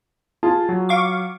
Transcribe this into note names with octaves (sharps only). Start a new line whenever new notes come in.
F4 G#4 A5
F#3
F5 C#6 D6